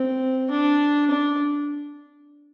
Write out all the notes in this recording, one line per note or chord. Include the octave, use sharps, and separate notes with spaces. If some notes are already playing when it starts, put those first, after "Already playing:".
Already playing: C4
D4
D4